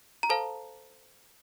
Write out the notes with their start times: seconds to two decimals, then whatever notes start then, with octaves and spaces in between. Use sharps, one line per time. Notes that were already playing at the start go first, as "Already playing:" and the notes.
0.23 A#5
0.30 A4 C5 F5 A5